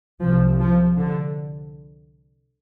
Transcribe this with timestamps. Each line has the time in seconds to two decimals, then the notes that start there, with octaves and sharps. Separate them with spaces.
0.21 C2 C3 F3
0.60 F3
0.99 D3